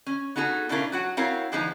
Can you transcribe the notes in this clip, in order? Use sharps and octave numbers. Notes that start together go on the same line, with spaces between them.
C#4
B3 D#4 F#4 G#4 A4
B2 C#4 D4 E4 F4 A#4
F#3 F#4 F#5
C4 E4 F#4 A#4 C#5 F5
D3 E3 F3 G#3 B3 D#4